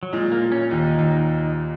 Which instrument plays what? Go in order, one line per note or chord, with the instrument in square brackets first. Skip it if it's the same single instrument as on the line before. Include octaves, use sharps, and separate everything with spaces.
[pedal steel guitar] F#3
[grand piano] A#2 [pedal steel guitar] G#3
[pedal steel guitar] A#3
[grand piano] A#2
[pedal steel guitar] C#4
[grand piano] D#2 [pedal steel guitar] D#4
[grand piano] D#2